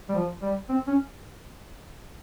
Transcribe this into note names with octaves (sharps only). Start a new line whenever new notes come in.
G3
F3
G3
C4
C#4